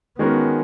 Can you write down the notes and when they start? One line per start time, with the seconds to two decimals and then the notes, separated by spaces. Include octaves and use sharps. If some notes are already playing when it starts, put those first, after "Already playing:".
0.19 D#3 G#3 B3 C#4 F#4 A#4